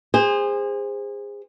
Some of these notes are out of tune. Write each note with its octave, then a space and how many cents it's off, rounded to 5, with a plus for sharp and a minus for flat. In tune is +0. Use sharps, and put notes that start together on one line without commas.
G#4 -30 C5 +0